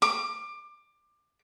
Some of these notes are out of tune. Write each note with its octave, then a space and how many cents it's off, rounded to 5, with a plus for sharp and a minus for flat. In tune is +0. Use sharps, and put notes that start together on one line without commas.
D6 +20